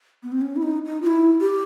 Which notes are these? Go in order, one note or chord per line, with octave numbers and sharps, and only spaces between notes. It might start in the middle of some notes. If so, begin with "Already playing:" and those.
B3
C4
C#4
E4
D#4
D#4
F4
E4
G4